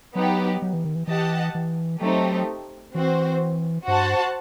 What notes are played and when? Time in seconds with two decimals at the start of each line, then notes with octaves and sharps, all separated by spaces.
0.15 F#3 B3 D#4 G4
0.62 F#3
0.73 E3
0.84 D#3
0.95 E3
1.07 E3 G4 D#5 F#5 A5
1.55 E3
2.01 F#3 A3 C4 D#4 G4
2.94 E3 C4 F#4 C5
3.87 G2 F#4 C5 F#5 A5